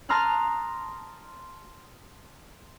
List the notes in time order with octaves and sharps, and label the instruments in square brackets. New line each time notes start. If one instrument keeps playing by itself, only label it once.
[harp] A5 A#5 C6 D#6 F6 F#6